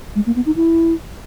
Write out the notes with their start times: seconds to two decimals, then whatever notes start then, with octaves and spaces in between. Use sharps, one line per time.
0.16 G#3
0.26 A#3
0.36 B3
0.46 D#4
0.56 E4